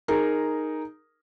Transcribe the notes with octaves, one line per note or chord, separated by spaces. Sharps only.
D#4 G#4 A#4